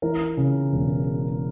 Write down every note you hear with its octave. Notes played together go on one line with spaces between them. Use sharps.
E3 A#4
C#3
E1